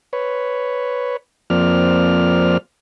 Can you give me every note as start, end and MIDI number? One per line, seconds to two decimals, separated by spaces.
0.13 1.17 71
0.13 1.17 73
1.50 2.57 41
1.50 2.57 53
1.50 2.57 58
1.50 2.57 60
1.50 2.57 74
1.50 2.57 89